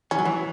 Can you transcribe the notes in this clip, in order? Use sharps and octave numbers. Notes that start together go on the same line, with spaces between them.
E3 C#4
F#3
E3